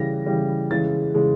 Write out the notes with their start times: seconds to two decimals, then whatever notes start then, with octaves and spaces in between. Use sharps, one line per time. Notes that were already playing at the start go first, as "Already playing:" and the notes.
Already playing: C#3 E3 G3 A#6
0.26 C#3 E3 G3
0.70 C#3 E3 G#3 A6
1.14 C#3 E3 G#3